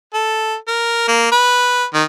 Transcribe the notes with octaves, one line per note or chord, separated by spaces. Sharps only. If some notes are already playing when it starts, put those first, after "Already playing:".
A4
A#4
A#3
B4
D#3